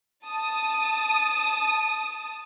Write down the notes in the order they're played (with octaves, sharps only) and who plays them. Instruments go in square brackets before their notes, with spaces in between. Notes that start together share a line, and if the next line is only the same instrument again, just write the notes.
[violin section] A5 D#6